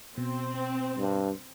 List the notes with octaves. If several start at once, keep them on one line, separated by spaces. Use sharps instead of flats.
B2 C4
G2